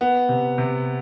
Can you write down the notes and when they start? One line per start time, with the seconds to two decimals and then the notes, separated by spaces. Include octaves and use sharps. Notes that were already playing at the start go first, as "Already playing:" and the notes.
0.01 B3
0.29 C3
0.58 C3